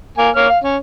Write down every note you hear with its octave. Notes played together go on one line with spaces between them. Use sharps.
A#3 G#5
A#3 C#5 F6
F5
C#4